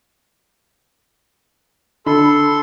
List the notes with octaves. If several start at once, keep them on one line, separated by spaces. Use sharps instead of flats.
D3 A4 B5 C6